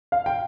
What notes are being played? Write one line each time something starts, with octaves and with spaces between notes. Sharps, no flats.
F5
G5